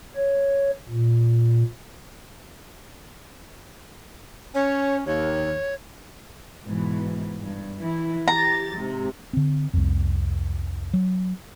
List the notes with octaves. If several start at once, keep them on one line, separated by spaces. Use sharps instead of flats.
C#5
A#2
C#4 C#5
D#2 C#5
G#2 B2 E3
G2
E3 E4
E3 G4 A#5 A6
G#2 C3
D3 C4
C2 F2
F#3